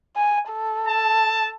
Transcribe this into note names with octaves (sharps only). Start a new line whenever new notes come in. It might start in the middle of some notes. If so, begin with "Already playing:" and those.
G#5
A4
A5